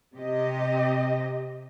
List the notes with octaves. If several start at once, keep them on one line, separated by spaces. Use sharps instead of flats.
C3 G4 D#5